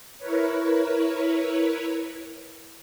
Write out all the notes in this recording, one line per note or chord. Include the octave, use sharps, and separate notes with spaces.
E4 A#4 B4 C#5